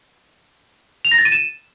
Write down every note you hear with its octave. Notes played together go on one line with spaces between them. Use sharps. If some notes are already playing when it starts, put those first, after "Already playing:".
F7
A#6
A6
D#7
E7